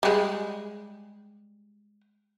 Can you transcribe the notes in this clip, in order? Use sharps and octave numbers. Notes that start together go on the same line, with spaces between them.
G3 G#3